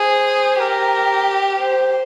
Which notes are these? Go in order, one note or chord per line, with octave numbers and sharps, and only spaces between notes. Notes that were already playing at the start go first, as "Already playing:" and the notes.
Already playing: G#4 C5
G4 A#4
C5